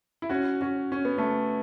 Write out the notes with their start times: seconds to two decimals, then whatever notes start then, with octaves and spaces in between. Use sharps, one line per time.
0.22 E4
0.30 C#4 F#4
0.61 C#4 F#4
0.92 C#4
1.05 B3
1.18 A3 C#4